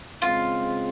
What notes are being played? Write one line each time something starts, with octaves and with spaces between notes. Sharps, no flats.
C#3 G#3 C4 F4